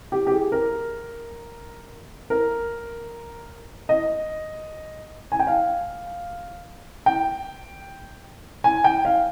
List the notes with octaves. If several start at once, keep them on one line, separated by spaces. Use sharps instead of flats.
G4
G4
G#4
A#4
A#4
D#5
G#5
G5
F5
G5
G#5
G5
F5